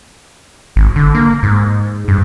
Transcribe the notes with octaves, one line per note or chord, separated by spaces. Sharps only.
G#1
D3
A#3
G#2
G2